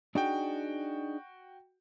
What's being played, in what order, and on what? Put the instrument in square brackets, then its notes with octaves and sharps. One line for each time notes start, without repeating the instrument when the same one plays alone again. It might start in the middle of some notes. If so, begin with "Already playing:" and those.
[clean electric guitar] D4 D#4 G#4 [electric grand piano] F#4 G5